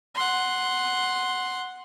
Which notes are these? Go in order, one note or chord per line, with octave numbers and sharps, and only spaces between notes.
F#5 C6